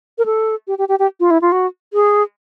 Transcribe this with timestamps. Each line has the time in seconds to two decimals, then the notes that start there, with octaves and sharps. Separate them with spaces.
0.18 A#4
0.26 A4
0.68 G4
0.78 G4
0.89 G4
0.99 G4
1.20 F4
1.31 E4
1.42 F4
1.52 F#4
1.93 G#4